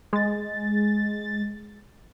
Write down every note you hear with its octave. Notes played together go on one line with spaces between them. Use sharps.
G#3 A6